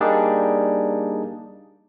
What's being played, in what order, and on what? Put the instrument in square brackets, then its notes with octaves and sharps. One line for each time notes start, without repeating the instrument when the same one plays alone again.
[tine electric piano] G3 A#3 D4 D#4 G#4 D5